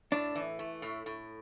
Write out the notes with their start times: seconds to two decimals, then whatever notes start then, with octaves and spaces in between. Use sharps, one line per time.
0.12 A2 D4
0.35 E3
0.59 A3
0.82 A2
1.06 A2